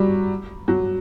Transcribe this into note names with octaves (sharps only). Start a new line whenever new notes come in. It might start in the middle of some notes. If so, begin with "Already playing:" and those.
Already playing: F#3 G3
F#3